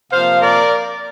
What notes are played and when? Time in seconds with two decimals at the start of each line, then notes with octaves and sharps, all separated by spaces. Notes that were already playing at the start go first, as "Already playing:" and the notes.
0.10 C3 F3 A#3 C5 F5
0.41 A#4 D5